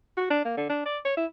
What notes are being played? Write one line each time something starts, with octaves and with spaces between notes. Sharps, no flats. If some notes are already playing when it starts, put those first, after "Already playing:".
F#4
D4
A#3
D3
D4
D5
C#5
E4